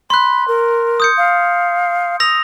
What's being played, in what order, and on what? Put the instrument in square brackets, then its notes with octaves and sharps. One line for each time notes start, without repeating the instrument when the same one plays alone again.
[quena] B5 [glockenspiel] C6 F#6
[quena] A#4
[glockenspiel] D#6 G6 C#7
[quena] F5
[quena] D#6 [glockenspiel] E6 A#6 F7